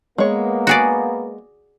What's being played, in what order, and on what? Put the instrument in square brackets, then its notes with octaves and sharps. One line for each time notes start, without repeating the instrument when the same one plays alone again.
[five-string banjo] G#3 C#5 [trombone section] A#3 B3
[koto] F#4 G#4 D5